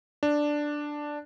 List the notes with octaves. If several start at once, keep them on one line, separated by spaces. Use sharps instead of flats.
D4